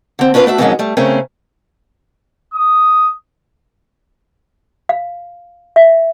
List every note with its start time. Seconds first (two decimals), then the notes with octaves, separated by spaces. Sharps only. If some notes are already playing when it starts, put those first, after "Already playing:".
0.19 D3 C4
0.34 C#4 D4 F4 A#4 B4 D5
0.46 A3 D4 F#4 E5
0.58 F2 G#2 D#3 F#3 G#3 C#4
0.79 G3 A3
0.97 C#3 A3 C4 C#4 A#4
2.52 D#6
4.89 F5
5.76 E5